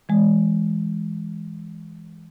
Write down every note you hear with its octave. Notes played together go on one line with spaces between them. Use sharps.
E3 G#3